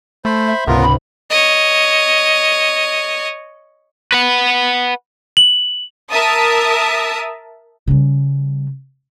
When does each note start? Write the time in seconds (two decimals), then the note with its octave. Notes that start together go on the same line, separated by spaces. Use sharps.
0.25 A3 C5 B5
0.47 E5
0.67 C#2 G#2 C3 B3 F4 A#4
0.82 B5
1.30 C#5 D#5
4.12 B4 F#5
5.37 F#7
6.12 A#4 E5 A5 D#6
7.87 C#3 G3